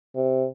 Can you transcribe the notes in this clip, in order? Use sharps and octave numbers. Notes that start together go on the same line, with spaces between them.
C3